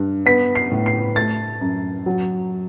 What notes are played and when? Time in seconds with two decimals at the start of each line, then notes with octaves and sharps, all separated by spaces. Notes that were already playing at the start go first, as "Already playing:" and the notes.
Already playing: G2
0.26 B3 B6
0.55 C7
0.71 A2
0.86 C7
1.16 A3 A6
1.61 F#2
2.06 F#3